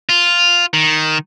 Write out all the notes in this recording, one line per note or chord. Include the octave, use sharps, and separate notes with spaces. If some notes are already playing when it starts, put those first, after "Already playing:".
F4
D#3